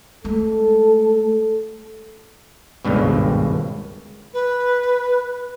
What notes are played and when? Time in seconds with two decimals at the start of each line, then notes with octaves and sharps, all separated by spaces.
0.24 G#3 A3 A4
2.85 G#1 C#2 G2 B2
4.34 B4